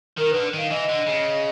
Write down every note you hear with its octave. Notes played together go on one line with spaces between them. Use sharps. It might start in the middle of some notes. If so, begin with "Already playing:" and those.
D#3 A#4
D3 B4
D#3 F5
E3 D#5
D3
C#3